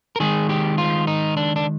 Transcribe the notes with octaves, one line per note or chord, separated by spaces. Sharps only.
A#4
D#3 G#3 G#4
G4
F4
D#4
D4
D4